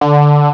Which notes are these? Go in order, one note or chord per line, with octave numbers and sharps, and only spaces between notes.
D3